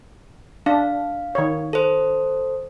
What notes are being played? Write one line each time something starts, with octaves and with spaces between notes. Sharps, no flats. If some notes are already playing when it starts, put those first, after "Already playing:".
D4 F5
D#3 C#5
A4 C5